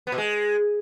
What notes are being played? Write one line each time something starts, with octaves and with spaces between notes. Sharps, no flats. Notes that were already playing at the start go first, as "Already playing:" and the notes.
B3
B2
G#3